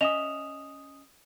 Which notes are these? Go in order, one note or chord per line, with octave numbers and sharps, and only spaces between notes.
C#4 D#5 E5 D#6 E7 F7